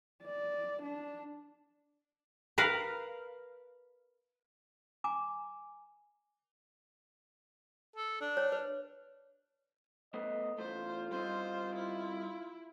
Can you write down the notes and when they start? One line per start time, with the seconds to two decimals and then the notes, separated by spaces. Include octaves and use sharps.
0.24 D5
0.83 D4
2.58 A#4 B4 F5
5.04 G#5 A#5 D6
7.96 A4
8.21 D4
8.37 C#5
8.52 B4
10.14 A3 B3 C5 D#5
10.58 E2 A3 F4 C5
11.11 G3 C4 D#4 C5
11.76 E4